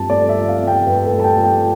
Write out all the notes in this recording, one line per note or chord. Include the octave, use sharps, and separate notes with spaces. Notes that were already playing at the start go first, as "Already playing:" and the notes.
Already playing: G2 F3 C4 A5
A3 D5
E5
F3
F5
C4
G5
G2 B4
A4
A3
A5
G5
F3
G5